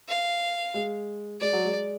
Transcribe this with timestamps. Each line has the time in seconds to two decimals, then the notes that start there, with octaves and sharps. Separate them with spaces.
0.08 F5
0.74 G#3
1.41 G#3 D5
1.53 F#3
1.65 G#3